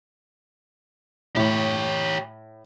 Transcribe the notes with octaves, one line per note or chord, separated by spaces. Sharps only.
A2 G4 C#5